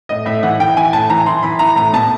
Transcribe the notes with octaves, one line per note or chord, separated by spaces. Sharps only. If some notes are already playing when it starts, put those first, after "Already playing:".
A2 D#5
A2 E5
E3 F#5
E3 G5
E3 G#5
A2 A5
E3 A#5
E3 C6
E3 B5
E3 A#5
A2 A#5
B2 A5